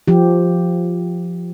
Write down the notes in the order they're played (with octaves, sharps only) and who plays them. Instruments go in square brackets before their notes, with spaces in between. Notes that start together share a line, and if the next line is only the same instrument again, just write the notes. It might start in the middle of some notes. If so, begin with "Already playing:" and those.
[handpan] F3 G4